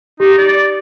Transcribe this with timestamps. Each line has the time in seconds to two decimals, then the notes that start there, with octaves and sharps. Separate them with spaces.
0.20 D#4 G4
0.38 D5